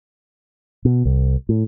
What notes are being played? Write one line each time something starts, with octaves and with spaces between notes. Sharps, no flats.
B2
C2
A2